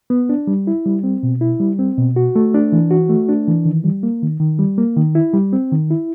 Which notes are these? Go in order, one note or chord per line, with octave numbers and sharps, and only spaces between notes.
B3
D4
G3
E4
G3
C4
B2
E4
G3
C4
B2
F#4
A3
D4
E3
F#4
A3
D4
E3
D#3
G3
A#3
D#3
D#3
G3
A#3
D#3
E4
G3
C4
D#3
E4